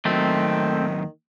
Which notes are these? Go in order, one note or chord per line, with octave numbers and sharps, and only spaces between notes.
D#2 D#3 F#3 A3 C4